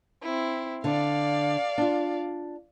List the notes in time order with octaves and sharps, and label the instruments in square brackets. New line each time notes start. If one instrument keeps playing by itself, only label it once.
[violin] C4 E4
[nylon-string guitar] D3 [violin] D5 F5
[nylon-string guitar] D4 F4